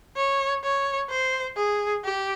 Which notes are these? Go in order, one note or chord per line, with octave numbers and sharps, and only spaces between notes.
C#5
C#5
C5
G#4
G4